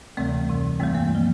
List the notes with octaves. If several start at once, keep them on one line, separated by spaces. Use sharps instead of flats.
D2 C3 E3 G3 A3 C4
F2 C3 E3
G2 E3 G3 A3 C4
A#3
F3